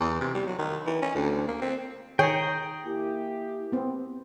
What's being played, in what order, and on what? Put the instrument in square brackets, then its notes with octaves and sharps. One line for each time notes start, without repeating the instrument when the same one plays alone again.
[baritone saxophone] E2
C3
G3
F#3
D#3
E3
C#4
D2
A#3
C4
[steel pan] D#3 C#5 [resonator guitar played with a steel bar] G#4 [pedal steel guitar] G5 A#5
[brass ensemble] A#3 E4 G4
[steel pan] B3 C4